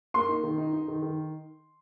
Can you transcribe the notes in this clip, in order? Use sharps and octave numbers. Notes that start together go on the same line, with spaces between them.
A#3 C6
D#4
D#3
D#4
D#4
D#3
D#3